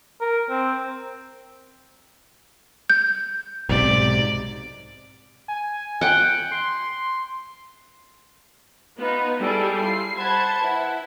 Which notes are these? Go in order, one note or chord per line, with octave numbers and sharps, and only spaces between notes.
A#4
C4
G6
B1 G#2 C3 D5
G#5
F#5 G5
C6
B3 D#4 F4 B4
G3 E4 G#4 A4
E4 F4 C7
C5 F#5 A5 B5 G#6
E4 B4 F#5